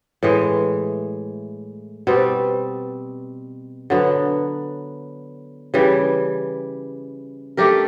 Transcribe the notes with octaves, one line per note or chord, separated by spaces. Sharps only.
A2 E3 G#3
B2 G3 C4
D3 F#3 B3
C#3 E3 G3
A3 D4 G4 A#4